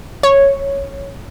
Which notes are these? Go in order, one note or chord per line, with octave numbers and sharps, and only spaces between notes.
C#5